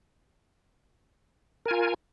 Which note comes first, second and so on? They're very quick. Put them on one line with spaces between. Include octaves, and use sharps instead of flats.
A#4 G#5 F4